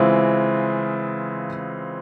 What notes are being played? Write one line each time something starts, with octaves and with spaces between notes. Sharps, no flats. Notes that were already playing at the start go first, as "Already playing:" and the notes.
Already playing: C#3 E3 G#3 C4 F4